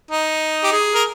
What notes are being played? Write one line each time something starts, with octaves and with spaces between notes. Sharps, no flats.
D#4
G4
G#4
A#4